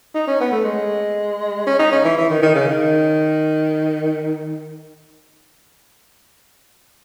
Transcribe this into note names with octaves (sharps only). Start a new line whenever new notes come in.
D#4
C#4
B3
A3
G#3
C#4
D#4
C#4
E3
E3
D#3
D#3
C#3
D#3